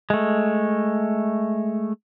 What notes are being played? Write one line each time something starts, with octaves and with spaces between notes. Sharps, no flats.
G#3 A3